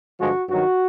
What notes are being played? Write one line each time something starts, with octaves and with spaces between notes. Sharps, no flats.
G2 D3 F3 G#3 F#4
G2 D#3 F#3 F#4